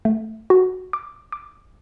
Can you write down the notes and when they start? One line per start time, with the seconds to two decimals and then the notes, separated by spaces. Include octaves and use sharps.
0.05 A3
0.50 F#4
0.93 D6
1.32 D6